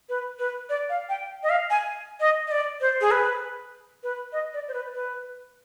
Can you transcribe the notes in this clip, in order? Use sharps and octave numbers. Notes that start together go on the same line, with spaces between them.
B4
B4
D5
F5
G5
D#5
F5
G#5
D#5
D#5
D5
C5
G#4
B4
B4
D#5
D5
C5
B4
B4